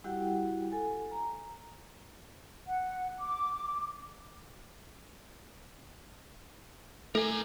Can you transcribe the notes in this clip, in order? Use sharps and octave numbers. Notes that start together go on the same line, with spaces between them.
G3 E4 F#4 G4 F#5 G5
A4 G#5
A#5
F#5
D6
A3 A4 A#4 G#5